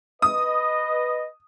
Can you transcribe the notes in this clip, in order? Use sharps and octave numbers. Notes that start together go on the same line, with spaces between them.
B4 D#5 D#6